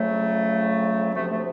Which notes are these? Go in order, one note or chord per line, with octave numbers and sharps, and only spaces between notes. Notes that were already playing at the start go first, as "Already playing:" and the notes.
Already playing: F2 C#3 F#3 A3
D2 C3 F3 A3
A3